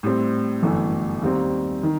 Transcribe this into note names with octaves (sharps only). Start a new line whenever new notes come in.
A2 G3 C4
G1 F#2 E3 A3
D#2 D#3 G3 C4
D#3